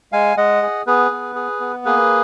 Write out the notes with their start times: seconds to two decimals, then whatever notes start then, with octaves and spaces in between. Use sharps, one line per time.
0.12 G#3 F5 G#5
0.37 G#3 D#5 F#5
0.62 G#4
0.87 B3 G#4 B4
1.11 B3
1.35 G#4
1.60 B3
1.85 A#3 G#4 B4